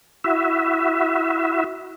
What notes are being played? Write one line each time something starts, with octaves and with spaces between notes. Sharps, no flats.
E4 F#4 E5